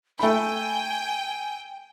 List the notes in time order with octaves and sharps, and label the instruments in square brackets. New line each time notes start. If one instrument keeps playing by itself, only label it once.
[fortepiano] A3 B5 [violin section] G5 [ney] G#5